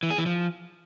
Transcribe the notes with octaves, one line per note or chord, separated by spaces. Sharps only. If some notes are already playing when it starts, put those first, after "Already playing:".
E3
G#4
E3
F3